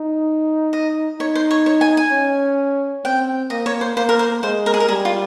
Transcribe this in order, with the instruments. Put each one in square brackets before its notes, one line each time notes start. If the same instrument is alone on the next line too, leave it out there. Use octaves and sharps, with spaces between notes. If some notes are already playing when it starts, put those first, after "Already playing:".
Already playing: [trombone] D#4
[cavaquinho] D#5
[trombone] D#4 [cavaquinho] C#5
[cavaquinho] C5
C#5
C#5
G#5
G#5
[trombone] C#4
[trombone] C4 [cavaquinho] G5
[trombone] A#3 [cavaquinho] D#5
[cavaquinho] C#5
C5
[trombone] A#3 [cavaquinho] C5
[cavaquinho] A#4
C5
[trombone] G#3 [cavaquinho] C5
[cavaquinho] A#4
G#4
A#4
[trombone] G3 [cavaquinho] G#4
[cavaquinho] F4